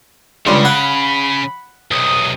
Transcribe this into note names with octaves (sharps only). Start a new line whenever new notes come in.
C#2 G2 C#3 C6
F#5 B5
B1 C3 D#6